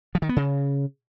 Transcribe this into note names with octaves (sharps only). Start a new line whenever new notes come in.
F3
D#3
B3
C#3